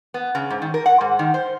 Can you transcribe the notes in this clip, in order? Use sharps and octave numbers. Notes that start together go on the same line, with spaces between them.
B3
C#3
G#2
D#3
A#4
F#5
G#2
D#3
C5